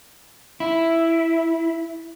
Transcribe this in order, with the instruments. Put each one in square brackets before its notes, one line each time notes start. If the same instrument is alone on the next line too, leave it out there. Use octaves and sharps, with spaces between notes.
[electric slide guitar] E4